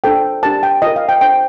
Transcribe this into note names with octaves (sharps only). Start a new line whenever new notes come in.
D4 F4 A4 C5 G5
D4 G4 A#4 A5
G5
F4 A#4 D#5
F5
G5
D4 A4 C5 G5